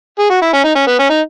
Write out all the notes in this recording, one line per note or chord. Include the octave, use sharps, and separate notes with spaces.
G#4
F#4
E4
C#4
D#4
C#4
B3
C#4
D#4